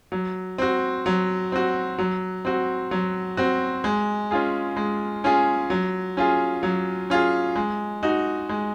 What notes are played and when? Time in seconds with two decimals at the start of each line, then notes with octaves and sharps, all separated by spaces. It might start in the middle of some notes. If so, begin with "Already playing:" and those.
0.12 F#3
0.58 C4 F#4
1.06 F#3
1.52 C4 F#4
1.99 F#3
2.45 C4 F#4
2.91 F#3
3.37 C4 F#4
3.84 G#3
4.31 C#4 F4 G#4
4.77 G#3
5.24 C#4 F4 G#4
5.70 F#3
6.17 C#4 F4 G#4
6.63 F#3
7.10 C#4 F4 G#4
7.56 G#3
8.03 D#4 F#4
8.49 G#3